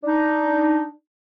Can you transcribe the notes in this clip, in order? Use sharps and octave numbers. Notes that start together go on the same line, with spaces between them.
D4 D#4